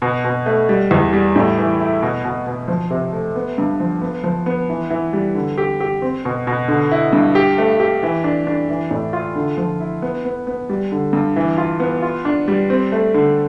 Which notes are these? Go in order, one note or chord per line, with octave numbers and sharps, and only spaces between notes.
B2
B2
A3
G3
E2
G3
A2
E3
E4
B2
B2
B2
F3
C3
A3
B3
G2
F3
B3
F3
B3
E3
E3
G3
D3
G4
G4
C4
B2
B2
D3
E4
G2
G4
A3
G4
E3
D4
D4
E3
A2
F4
D3
F3
E4
B3
B3
B3
G3
D3
G2
E3
F4
B3
F4
D4
G3
C4
A3
D3